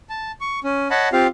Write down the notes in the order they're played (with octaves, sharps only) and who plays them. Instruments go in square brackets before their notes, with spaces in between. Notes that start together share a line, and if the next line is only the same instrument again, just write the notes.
[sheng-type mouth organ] A5
C#6
C#4
C#5 D#5 F#5 A5 B5
C4 F4 G4 F5